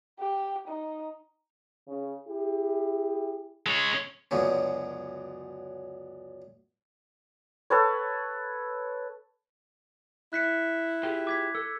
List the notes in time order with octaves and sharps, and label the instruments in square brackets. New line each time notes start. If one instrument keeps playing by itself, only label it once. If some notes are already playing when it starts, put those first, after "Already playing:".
[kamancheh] G4
D#4
[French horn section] C#3
E4 G4 G#4
[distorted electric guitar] G#3 C#5
[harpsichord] C#2 F#2 B2 D3 C#4
[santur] A4 B4 C#5
[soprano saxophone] E4 [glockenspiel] F#6 B6 C#7
[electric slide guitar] F4 G4 G#4
[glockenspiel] D6 G#6 B6
[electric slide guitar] A4 [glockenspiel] E6